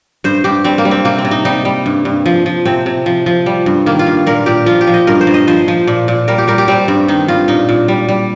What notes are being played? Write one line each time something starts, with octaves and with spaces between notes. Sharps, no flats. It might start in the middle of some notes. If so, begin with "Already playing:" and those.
G2 C5
G2 G4
G3 C4
A#3
G3
C4
C3 A#3
C4
C3
D#4
G3 D#4
G3
G2
G2
F3
F3
C3 C4
C3
F3
F3
G3
G2
D#3 A#3
F4
G2
A#2 A#4
A#2 G4
F3 F4
G4
F3
D#5
G2 A#4
C5
G2
D#5
F3 C5
F3
A#2
A#2
G3 A#4
G4
G3 A#4
G4
G3 C4
G2
D#3 D#4
G2 F4
A#2 D#4
A#2
G3
G3